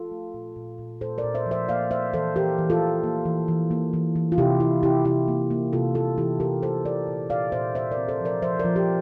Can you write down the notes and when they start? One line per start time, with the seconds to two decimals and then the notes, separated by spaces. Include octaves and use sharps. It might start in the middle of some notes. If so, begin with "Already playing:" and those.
Already playing: F4 A4
0.11 A3
0.34 A#2
0.56 A#2
0.78 A#2
1.01 A#2 A4 C5
1.18 A#4 D5
1.24 A#2
1.35 C5 E5
1.46 F3
1.51 C5 E5
1.68 A#3 D5 F5
1.91 A#3 C5 E5
2.14 E3 A4 C5
2.36 E3 G4 A#4
2.58 E3
2.70 F4 A4
2.81 E3
3.04 A#3
3.25 E3
3.48 E3
3.71 A#3
3.93 E3
4.16 E3
4.32 F4
4.38 C3 E4 G4
4.60 C3 E4
4.83 C3 E4 G4
5.05 C3 E4 G4
5.28 A#3
5.51 A#3
5.73 C3 F4 A4
5.95 A#3 F4 A4
6.18 E3 E4 G4
6.40 C3 G4 A#4
6.62 C3 A4 C5
6.85 C3 A#4 D5
7.08 A#2
7.30 A#2 D5 F5
7.52 A#2 C5 E5
7.75 C4 C5 E5
7.91 A#4 D5
7.98 C4
8.08 A4 C5
8.20 F3
8.25 A#4 D5
8.42 F3 C5 E5
8.60 A#4 D5
8.65 F3
8.76 G4 A#4